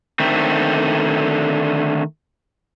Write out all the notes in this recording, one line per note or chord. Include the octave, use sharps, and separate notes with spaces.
D3 D#3 A3 C4